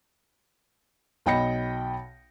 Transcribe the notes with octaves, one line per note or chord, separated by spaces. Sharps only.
B1 D#5 G5 B5 A#6 C#7